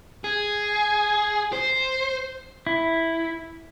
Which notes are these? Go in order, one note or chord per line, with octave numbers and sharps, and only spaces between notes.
G#4
C5
E4